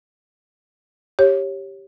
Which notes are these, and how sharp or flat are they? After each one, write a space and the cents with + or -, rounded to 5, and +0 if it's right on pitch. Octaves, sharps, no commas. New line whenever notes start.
G4 +0 C#5 -15